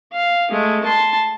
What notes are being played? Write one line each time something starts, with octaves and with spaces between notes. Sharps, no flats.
F5
G#3 A3
A5 C6